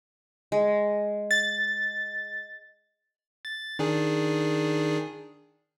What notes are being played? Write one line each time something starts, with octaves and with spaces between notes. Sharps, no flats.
G#3
A6
A6
D#3 D4 G#4